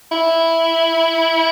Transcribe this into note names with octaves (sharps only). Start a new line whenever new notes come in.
E4